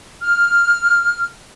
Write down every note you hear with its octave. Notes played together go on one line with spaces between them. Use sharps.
F6